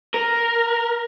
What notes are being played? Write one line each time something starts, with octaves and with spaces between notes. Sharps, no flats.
A#4